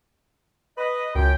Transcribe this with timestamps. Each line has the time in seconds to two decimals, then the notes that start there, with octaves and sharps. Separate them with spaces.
0.78 B4 D#5
1.15 C#2 F#2 G5